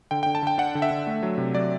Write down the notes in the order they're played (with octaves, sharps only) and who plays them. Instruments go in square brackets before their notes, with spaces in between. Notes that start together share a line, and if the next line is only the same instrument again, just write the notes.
[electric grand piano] D3 G5
D3 G5
A5
D3 G5
D4 F#5
D3
E5
D3
A3
F#3
C3
F#3 D5